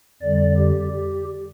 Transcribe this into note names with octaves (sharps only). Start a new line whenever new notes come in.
F2 D3 G3 D5
G4
G4